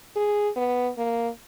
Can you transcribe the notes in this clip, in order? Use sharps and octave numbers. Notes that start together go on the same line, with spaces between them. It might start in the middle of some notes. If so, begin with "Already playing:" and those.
G#4
B3
A#3